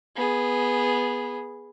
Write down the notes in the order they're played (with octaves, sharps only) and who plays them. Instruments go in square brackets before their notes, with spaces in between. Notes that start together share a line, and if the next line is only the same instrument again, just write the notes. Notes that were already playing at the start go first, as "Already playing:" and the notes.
[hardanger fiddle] B3 G#4